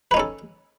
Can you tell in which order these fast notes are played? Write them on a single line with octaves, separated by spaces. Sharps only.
B4 D#4 C#4 A4